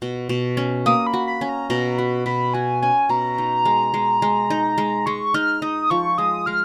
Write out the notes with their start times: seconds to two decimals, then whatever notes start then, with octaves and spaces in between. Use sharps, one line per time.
0.02 B2
0.29 B2
0.57 C#4
0.86 A#3 D#6
1.07 B5
1.13 F#4
1.27 B5
1.41 C#4
1.49 A#5
1.70 B2 A#5
1.98 F#4 B5
2.26 B2 B5
2.54 F#4 G#5
2.82 C#4 G#5
3.09 B2 A#5
3.38 D#4
3.65 G#3
3.94 G#3
4.22 G#3
4.50 D#4
4.78 G#3
5.06 G#3 C#6
5.34 D#4 F6
5.62 D#4 D#6
5.90 F3 C#6
6.18 G#3 D#6
6.46 G#3 F6